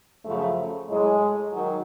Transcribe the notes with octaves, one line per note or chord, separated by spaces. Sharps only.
F#2 C#3 F3 A3
A2 F#3 G#3
D#3 F#3